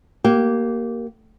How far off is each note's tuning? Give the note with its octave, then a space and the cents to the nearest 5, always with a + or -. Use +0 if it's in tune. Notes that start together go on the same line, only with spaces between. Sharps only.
A#3 +0 G4 -20